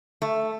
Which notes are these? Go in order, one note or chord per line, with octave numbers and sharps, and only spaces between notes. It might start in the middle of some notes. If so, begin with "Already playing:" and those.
A3